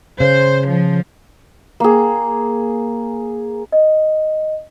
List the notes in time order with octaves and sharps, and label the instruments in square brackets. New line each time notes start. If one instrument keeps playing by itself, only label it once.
[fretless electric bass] C#3 [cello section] C5
[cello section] F3
[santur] A#3 G#4
[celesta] D#5